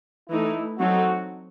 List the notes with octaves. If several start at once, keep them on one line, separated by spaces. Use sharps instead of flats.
E3 A3 D#4 E4
F#3 C4 D#4 F#4 A4